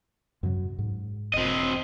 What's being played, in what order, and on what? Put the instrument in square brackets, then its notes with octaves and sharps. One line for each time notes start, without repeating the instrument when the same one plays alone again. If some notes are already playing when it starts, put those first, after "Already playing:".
[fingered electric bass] F#2 C3 F#3
G#2
[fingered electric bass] E1 [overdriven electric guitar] C4 D#5